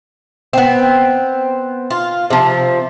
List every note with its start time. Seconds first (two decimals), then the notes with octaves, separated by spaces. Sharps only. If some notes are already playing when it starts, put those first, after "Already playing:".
0.53 B3 C4
1.90 F4
2.30 C3 F3